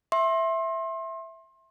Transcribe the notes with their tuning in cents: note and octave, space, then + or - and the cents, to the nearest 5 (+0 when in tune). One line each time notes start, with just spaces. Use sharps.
E5 +0 C6 +30